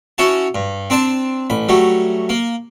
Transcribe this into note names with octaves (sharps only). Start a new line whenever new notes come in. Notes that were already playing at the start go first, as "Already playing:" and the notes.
C#4 E4 F#4 A5
G2
C4 D4 D5 A5
A1 B5
F#3 G3 A3
A#3